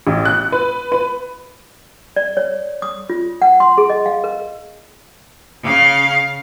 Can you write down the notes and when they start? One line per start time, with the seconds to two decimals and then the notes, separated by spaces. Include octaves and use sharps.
0.07 A1
0.25 F#6
0.52 B4
0.92 B4
2.16 D5
2.37 C#5
2.82 D#6
3.10 F4
3.42 F#5
3.60 C6
3.78 G#4
3.90 D#5
4.06 F5
4.24 A#4
5.63 C#3 F5